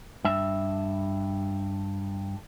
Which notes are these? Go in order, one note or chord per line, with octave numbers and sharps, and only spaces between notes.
G2 E5